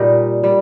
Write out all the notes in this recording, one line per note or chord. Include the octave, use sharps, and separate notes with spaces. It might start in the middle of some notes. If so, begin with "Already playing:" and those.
Already playing: A#2 G3 D#4 F4 G4
G3